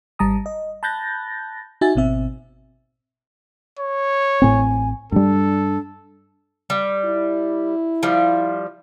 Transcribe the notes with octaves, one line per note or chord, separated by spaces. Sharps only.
G#1 G3 A5 A#5 D#6
D#5
A5 B5 F#6 G6 A6 A#6
D#4 F#4 E5 G#5 A6
G#1 B2 C4 E5
C#5
A1 A2 C4 G#5
G2 G3 D4 A4
G3
E4
F3 G3